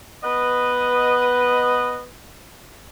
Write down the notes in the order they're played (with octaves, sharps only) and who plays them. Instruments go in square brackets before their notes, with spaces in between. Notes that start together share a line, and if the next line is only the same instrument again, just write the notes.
[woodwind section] B3 B4 D#5